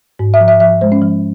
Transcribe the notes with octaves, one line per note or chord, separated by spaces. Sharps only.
G#2
E5
F3
E5
F3 E5
G#3 C5
C#4
F3